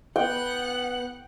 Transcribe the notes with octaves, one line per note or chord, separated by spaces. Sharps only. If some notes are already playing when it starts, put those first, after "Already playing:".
B3 F#5 G5 F#6